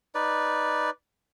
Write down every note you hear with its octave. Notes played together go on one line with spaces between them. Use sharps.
D#4 B4 D5